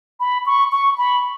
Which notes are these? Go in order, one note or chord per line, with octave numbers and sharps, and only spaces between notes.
B5
C#6
C#6
B5